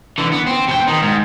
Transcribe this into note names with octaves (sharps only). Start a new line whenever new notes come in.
D3 E3
B3
C4
B2 G5
D#3 D#4
G#2